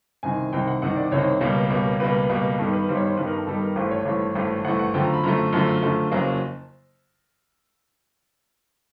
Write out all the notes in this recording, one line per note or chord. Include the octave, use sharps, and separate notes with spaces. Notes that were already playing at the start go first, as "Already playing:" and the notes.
C2 C3 D#3 G#5
C2 C3 D#3 G5
F#5
C2 C3 D#3 F#5
D5
C2 C3 D#3 C#5
C#2 B2 G3 A#3
C#2 B2 G3 A#3
C#2 B2 G3 A#3 B4
B4
C#2 B2 G3 A#3
G2 D#3 G3 B3 A4
B4
G2 D#3 G3 B3 C5
C#5
C5
G2 D#3 G3 B3 B4
A#4
A4
G2 D#3 G3 B3 A4
A#4
G#1 G2 E3 A3 C5
C#5
G#1 G2 E3 A3
G#1 G2 E3 A3
G#1 G2 E3 A3 F#5
F#5
F#2 D3 F3 A3 G5
A#5
B5
F#2 D3 F3 A3 A#5
F#2 D3 F3 A3 A5
F#2 D3 F3 A3
F#1 F2 C#3 F#3 A#3